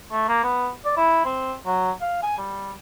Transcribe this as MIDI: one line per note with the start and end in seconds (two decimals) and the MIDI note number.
0.12 0.25 57
0.28 0.44 58
0.44 0.70 59
0.85 0.94 74
0.97 1.24 64
1.25 1.54 60
1.66 1.91 54
2.01 2.21 77
2.23 2.38 80
2.38 2.72 55